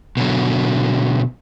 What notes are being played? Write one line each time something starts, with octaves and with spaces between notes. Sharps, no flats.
B2 D3 F#3